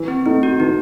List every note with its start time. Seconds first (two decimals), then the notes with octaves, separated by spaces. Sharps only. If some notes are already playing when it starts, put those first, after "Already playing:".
Already playing: E3
0.08 C4
0.26 A3 C4 D#4
0.43 F#4
0.60 E3 D#4